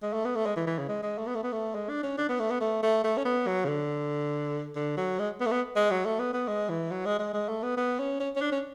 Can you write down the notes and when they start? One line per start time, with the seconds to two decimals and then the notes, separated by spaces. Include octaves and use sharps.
0.03 G#3
0.13 A3
0.25 B3
0.35 A3
0.46 G#3
0.57 E3
0.67 E3
0.79 C#3
0.89 G#3
1.03 G#3
1.18 A3
1.27 B3
1.35 A3
1.44 B3
1.52 A3
1.75 G#3
1.89 D4
2.03 C#4
2.18 D4
2.29 B3
2.40 A3
2.50 B3
2.61 A3
2.83 A3
3.04 A3
3.17 C#4
3.25 B3
3.47 F#3
3.64 C#3
3.68 D3
4.76 D3
4.97 F#3
5.19 G#3
5.40 B3
5.46 A3
5.51 B3
5.76 G#3
5.91 F#3
6.05 A3
6.19 B3
6.33 B3
6.48 G#3
6.69 E3
6.91 F#3
7.06 G#3
7.19 G#3
7.34 G#3
7.49 A3
7.63 B3
7.77 B3
7.99 C#4
8.20 C#4
8.36 C#4
8.41 D4
8.52 C#4